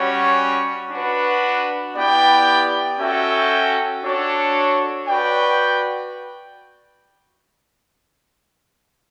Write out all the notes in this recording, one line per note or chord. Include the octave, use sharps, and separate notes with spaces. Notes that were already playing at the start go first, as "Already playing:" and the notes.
Already playing: G3 C#4 F#4 C#5
D4 F#4 B4
B3 E4 G4 D5 G5
C#4 F#4 A4 E5 G5
D4 F#4 A4 C#5
F#4 B4 D5 G5